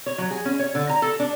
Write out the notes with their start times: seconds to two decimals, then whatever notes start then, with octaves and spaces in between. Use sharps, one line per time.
0.06 C#5
0.18 F#3
0.31 G#4
0.45 C#4
0.59 C#5
0.75 D3
0.89 A#5
1.02 A4
1.20 D4